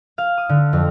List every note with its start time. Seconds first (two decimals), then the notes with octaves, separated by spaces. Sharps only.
0.18 F5
0.37 D#6
0.49 D3
0.73 F2